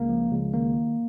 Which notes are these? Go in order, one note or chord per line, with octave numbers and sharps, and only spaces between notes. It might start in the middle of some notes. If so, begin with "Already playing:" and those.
Already playing: C#2 A#3
F3
C#2
D#3 A#3